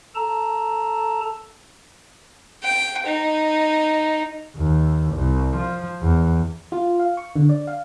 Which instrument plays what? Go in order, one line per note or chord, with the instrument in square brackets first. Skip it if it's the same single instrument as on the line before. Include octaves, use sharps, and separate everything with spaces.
[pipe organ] A4 A5 A#5
[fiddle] G5
D#4
[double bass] D#2
C2
F3
E2
[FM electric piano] F4
F5
C#6
D3
D5
F5